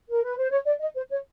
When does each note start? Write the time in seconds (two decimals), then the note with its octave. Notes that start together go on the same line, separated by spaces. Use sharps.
0.11 A#4
0.24 B4
0.37 C5
0.50 C#5
0.65 D5
0.80 D#5
0.96 C5
1.10 C#5